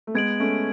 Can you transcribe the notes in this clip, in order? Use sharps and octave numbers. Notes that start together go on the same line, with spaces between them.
A3
G#3 B3 G#6 D7 F#7
A3 C#4